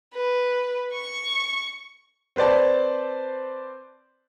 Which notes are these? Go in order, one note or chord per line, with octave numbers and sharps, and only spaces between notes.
B4
C#6
C4 B4 C5 D5 A5